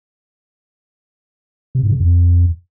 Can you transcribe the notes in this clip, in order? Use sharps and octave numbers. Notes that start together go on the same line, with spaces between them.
C3
G#2
C#3
F2